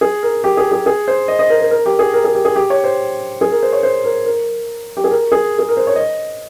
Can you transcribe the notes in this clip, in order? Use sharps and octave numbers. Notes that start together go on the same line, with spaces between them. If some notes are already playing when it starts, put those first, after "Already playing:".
G#4
A#4
G4
G#4
G#4
G#4
C5
D#5
D#5
A#4
A#4
A#4
G4
G#4
A#4
G#4
G4
G#4
G4
C#5
C5
G#4
A#4
C5
C#5
C5
A#4
A#4
G4
G#4
A#4
G#4
G#4
A#4
C5
C#5
D#5